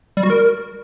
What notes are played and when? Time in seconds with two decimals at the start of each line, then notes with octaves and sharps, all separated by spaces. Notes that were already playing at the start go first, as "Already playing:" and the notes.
0.17 G3
0.23 F#4
0.30 A#4